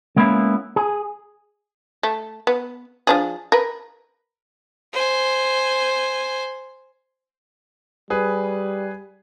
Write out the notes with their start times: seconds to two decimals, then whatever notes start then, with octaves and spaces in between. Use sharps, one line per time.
0.16 G#3 A#3 B3 C#4 E4
0.76 G#4
2.03 A3
2.47 B3
3.07 F3 D4 G#4
3.52 A#4 B4
4.93 C5 G#5
8.10 G3 G#4 B4